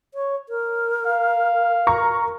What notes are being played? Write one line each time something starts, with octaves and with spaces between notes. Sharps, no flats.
C#5
A#4
F5
A#4 A#5 C#6